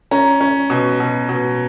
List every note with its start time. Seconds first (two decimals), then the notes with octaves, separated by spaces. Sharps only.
0.11 C#4 A#5
0.41 C#4
0.70 B2
1.00 B2
1.29 B2